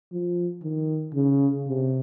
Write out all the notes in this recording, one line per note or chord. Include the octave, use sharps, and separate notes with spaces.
F3
D#3
C#3
C3